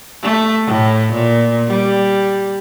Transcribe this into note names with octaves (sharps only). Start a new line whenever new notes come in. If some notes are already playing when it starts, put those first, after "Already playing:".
A3
A2
A#2
G3